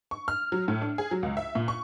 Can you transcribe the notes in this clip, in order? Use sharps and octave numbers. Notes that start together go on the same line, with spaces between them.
C#6
F6
F#3
A2
D4
G#4
F#3
C#2
E5
A#2
C#6